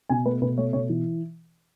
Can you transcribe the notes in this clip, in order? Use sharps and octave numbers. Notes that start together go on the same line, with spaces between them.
B2 G#5
A3 B4
B2 B4
A3 C#5
B2 C#5
E3